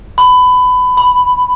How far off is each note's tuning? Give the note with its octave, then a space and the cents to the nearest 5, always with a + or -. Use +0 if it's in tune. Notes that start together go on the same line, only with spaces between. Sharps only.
B5 +20
B5 +5